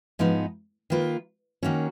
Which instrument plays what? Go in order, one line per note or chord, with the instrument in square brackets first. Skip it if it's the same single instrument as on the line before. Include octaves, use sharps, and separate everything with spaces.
[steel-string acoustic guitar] G#2 F3 G#3 B3 D#4
D#3 A#3 F4 B4
D#3 A#3 C#4 F#4